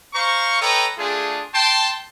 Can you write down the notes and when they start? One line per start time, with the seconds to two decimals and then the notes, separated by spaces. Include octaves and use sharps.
0.14 C5 F5 A#5 C#6
0.61 A4 B4 C#5 D#5 G5 A#5
0.98 A3 D4 F4 G#4
1.54 G5 A5 C6